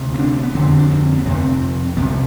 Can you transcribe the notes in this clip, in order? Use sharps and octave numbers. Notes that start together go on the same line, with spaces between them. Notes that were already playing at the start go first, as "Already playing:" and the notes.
Already playing: D2 C3
C4
D4
B3
F2 D3 C4
D4
C4
B3
F2 C3 C4
C2 C3 B3